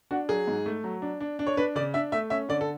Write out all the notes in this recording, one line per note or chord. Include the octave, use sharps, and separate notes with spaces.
D4 F#4
F#3 G#4
G#2
A3
F#3
D4
D4
D4
C#5
D4 B4
C#3 D5
D4 E5
A3 E5
C#4 E5
D3 D5
A4